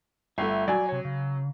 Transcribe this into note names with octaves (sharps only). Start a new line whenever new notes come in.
G1 A3 E5
F#3 D5 G#5
C3 C#5
C#3